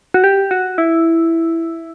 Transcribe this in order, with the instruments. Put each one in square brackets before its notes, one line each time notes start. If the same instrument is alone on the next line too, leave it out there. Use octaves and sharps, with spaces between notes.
[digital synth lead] F#4
G4
F#4
E4